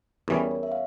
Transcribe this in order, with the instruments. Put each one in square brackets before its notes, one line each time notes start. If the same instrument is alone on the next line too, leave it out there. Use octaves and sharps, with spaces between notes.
[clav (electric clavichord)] E2 E3 G3 C#4 [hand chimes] A#4
[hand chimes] C#5
C#5
E5
F5